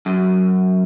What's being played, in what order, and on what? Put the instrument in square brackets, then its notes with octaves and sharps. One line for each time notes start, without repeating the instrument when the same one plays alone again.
[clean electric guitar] F#2